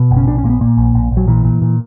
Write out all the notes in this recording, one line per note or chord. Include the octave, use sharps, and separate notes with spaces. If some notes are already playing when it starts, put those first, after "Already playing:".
Already playing: B2
F#1
C#4
A#1 D4
C#4
A#2 A#3
B3
A#2 A#3
A#1
A#1
A#1
F#3
A#2 E3
A#2
A#2